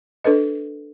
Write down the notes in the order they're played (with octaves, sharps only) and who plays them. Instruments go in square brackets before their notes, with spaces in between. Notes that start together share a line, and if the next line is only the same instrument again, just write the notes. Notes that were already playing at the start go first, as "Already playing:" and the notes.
[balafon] D4 A4 B4 D#5